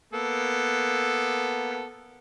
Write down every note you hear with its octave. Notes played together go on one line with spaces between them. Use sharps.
A#3 B3 A4